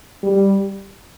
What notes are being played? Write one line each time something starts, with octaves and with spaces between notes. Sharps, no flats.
G3